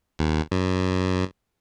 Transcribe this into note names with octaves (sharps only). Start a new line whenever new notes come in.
D#2
F#2